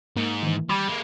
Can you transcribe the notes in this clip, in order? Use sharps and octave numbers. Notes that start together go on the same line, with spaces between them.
G#2 A#3
D#3 E3
G3 B5 D6 G#6
G#3 A#3